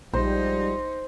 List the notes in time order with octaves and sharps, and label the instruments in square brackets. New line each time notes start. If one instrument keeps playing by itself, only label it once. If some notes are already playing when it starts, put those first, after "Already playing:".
[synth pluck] A#1 [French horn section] G#2 F3 G3 [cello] D#4 [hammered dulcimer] C5